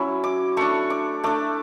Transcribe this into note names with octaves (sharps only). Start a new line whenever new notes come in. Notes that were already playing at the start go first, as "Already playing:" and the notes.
Already playing: F#3 C#4 E4 C#6
D6
A3 D4 C#6
D6
A3 D4 D6